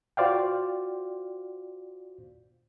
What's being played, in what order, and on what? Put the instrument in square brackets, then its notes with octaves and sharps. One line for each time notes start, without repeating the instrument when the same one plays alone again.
[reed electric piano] F4 F#4 C5 D5 F5 G5